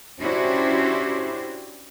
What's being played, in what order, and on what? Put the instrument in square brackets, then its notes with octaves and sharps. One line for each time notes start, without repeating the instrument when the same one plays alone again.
[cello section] C#4 D4 E4 F#4 G4 C5